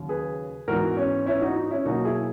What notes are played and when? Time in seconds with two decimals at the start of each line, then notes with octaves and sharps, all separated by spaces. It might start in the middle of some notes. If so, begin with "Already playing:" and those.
Already playing: D#2 C#3 F#3
0.09 G#4 B4
0.68 G#2 E3 B3 F#4 A#4
0.97 C#4
1.26 C#4 E4
1.41 D#4 F#4
1.56 D#4
1.71 C#4 E4
1.85 B2 F#3 A#3 D#4 F#4
2.05 E4 G#4